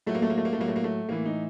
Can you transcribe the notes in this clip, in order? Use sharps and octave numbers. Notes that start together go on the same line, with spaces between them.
A2 F#3 A3
A#3
A3
A#3
A3
A#3
A3
A2 F#3 A#3
A3
A#3
A3
A2 E3 A#3
D#4